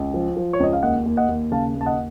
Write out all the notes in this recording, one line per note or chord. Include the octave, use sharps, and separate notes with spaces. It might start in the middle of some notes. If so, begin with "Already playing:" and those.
Already playing: C#2
F3
F3
C#5
C#2 D#5
F5
D#2 D#5 F#5
D#2
D#5 F#5
D#2
C#3 F5 A5
D#2
A5
D#5 F#5